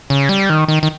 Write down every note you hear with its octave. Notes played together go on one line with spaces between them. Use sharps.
C#3
G3
D#3
D#3
D#3